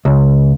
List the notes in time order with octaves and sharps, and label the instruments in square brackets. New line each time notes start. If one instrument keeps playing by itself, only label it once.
[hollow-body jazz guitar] C#2